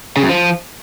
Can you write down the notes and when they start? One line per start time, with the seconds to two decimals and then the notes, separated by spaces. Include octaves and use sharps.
0.17 C#3
0.23 F#2
0.29 F3